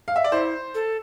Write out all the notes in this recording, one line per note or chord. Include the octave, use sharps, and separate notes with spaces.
F5
E5
D5
E4 C5
A4